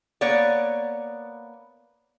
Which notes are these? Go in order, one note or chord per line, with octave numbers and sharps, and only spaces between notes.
A#3 B3 C#5 D5